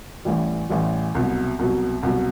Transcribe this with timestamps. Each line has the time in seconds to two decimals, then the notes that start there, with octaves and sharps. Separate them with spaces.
0.25 A1 A2 E3 G3
0.69 A1 A2 E3 G3
1.15 C2 B2 F#3
1.59 C2 B2 F#3
2.03 C2 B2 F#3